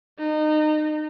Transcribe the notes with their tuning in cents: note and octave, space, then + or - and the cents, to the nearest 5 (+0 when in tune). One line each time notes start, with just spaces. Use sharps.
D#4 -25